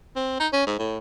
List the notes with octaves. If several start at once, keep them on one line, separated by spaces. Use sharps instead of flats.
C4
D#4
C#4
G#2
A2